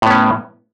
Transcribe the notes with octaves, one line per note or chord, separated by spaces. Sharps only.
A2 B3 C#4